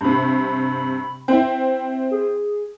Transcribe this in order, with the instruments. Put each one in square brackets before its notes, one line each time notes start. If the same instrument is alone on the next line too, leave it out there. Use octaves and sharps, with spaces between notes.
[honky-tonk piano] G2 C3 [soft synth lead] B5
[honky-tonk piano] C4 E4 [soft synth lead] G5
[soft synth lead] G#4